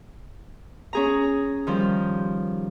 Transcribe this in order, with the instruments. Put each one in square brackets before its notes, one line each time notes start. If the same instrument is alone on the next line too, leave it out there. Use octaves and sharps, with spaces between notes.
[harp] C#4 G#4 A#5
D#3 F3 G3